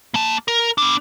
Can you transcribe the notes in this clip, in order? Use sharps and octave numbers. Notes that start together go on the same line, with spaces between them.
A#3 A5
A#4
B3 D4